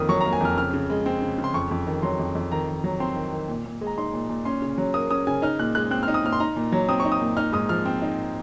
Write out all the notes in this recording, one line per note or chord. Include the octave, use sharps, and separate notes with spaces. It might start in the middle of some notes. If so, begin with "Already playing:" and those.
Already playing: F2 D#3 A#3 D#6 F6
F#3 C#6
A#5
A#3
G#5
F2 F6
C#3 F6
C#3
G#3
C4
C#3
C#3
C6
F2 C#6
F2
D#3
F#3 C6
F2
F2
D#3 A#5
D#3
F#3
C4 C6
D#3
D#3
A#2
A#2
G#3
A#5
D#4 C6
A#2
A#2
C#4 C6
C#3
F#3
A#3 D#6
C#4 D#6
C#3 G#5
D#4 F6
A#2 F#6
G#3 F#6
C4 F#6
D#4 F6
D#6
A#2 F6
C6
D#4 A#5
A#2
F#3
C4 D#6
C#6
D#4
D#6
A#2
D#4 F6
G#2 D#6
F3 F6
C4
D#4